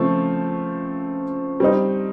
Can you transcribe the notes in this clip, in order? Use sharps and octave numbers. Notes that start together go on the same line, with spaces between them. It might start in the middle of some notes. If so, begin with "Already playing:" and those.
Already playing: C#3 F3 A3 C4 F4
G3 C4 D#4